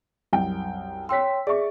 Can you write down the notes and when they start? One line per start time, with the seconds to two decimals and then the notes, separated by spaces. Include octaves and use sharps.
0.33 C2 F#2 G5
1.09 C#5 G5 C6 E6 B6
1.47 G#4 D5 E5 C#6